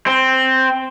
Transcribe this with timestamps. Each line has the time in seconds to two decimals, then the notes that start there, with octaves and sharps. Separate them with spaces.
0.06 C4